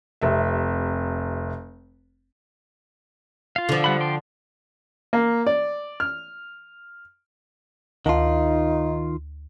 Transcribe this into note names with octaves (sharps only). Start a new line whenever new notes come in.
F1 C3 E5
F4 F5
D3 F3
G3 F#5 B5
D5 G5 C6
A#3
D5
F6
D2 D#3 D#4 F4 A5